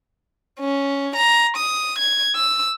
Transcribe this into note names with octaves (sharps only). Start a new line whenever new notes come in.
C#4
A#5
D#6
G#6
E6